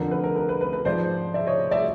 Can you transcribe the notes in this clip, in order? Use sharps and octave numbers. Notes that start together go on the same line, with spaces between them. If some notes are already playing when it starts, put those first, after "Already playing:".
Already playing: F2 D3 F3 A#4
B4
A#4
A#4
B4
B4
B4
G#2 F3 C5 D5
D5 E5
C#5 D#5
D5 E5